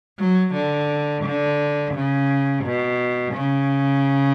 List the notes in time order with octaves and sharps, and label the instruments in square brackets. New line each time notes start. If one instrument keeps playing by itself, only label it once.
[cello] F#3
D3
D3
C#3
B2
C#3